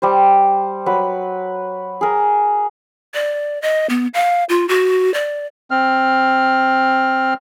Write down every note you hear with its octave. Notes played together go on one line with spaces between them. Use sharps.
G3 C5
F#3 B4
G#4 A#4
D5
D#5
B3
F5
F4
F#4
D5
C4 F6